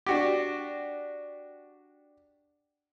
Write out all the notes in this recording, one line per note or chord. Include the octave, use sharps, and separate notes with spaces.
D4 F#4 G4